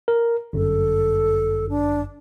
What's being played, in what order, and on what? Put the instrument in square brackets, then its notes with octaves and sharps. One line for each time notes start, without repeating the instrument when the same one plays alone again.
[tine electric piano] A#4
[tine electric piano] G1 F#2 [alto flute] A4
[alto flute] D4